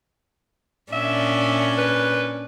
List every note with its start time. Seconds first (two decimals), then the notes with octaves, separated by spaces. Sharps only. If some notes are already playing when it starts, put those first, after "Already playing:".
0.93 A#2 C#4 D4 E5
1.78 B4